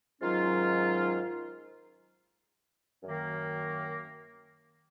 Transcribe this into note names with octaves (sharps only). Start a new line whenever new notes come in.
G#2 D#3 F#3 C#4 F4
F#2 D#3 A#3